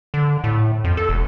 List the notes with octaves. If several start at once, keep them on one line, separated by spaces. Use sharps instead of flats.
D3
A2
F2
A4
E1